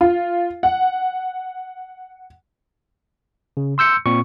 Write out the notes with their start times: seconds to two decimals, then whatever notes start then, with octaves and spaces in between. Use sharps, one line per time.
0.01 F4
0.63 F#5
3.57 C#3
3.78 C6 E6 G6 C#7
4.06 A#2 C4 C#6